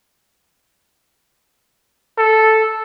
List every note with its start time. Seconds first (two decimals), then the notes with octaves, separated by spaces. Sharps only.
2.18 A4